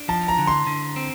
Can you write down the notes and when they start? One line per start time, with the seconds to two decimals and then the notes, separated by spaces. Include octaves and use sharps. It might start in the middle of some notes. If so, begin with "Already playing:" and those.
Already playing: D4
0.08 F3 A5
0.28 A#5
0.38 D3
0.47 C6
0.67 D3
0.96 C4